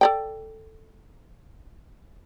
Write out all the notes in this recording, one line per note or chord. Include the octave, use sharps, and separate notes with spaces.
A4 D5 G5